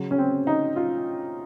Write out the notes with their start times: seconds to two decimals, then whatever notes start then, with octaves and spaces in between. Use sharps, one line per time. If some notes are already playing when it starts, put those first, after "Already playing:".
Already playing: C#3 F#3
0.11 C#4
0.18 C4
0.47 D#4
0.76 F4